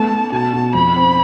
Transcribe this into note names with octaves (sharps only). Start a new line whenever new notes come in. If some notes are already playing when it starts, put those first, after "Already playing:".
Already playing: A3 B3 A5
A3
B2 A5
B2
F2 B5
C4